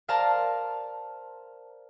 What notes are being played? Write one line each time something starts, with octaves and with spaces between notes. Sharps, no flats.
A#4 C5 D5 F5 A5 A#5